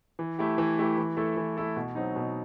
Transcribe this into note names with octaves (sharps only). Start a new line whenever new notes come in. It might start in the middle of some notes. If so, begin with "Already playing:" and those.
E3
A3 E4 G4
E3
A3 E4 G4
E3
A3 E4 A4
E3
A3 E4 A4
B2
F#3 C4 D#4
B2